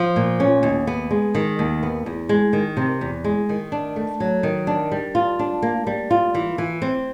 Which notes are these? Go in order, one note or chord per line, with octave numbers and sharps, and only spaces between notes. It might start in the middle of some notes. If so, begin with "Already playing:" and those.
Already playing: F3
A#2
C#4
D#2
B3
G#3
D#3
D#2
B3
E2
G#3
D#3
C3
E2
G#3
D#3
D4
A3
F#3
D#3
D4
G3
F4
D4
A#3
G3
F4
E3
E3
C4